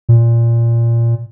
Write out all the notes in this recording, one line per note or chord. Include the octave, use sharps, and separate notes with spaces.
A#2